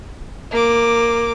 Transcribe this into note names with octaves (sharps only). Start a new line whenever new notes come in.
A#3 D6